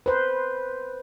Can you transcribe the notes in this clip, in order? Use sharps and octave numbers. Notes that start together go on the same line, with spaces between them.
B4 C5